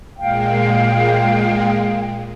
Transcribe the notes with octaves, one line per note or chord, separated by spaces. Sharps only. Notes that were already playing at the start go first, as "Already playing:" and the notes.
A#2 G#3 F5 G5